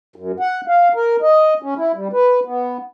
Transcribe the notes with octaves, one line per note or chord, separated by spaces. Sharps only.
F#2
F#5
F5
A#4
D#5
C#4
E4
G3
B4
B3